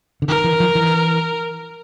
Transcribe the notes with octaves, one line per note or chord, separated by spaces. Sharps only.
D3
D#3 A#4
E3
F3
E3